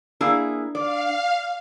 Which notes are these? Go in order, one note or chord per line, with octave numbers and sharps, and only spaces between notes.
A#3 D4 E4 G#4
D5 F5